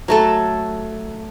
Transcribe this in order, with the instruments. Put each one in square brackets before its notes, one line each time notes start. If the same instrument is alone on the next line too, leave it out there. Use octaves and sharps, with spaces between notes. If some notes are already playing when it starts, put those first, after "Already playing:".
[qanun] F#3 A3 A4